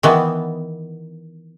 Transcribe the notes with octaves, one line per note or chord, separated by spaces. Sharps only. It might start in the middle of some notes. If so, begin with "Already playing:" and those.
D#3 E3 B3